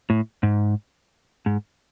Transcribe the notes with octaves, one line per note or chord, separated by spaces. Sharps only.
A2
G#2
G#2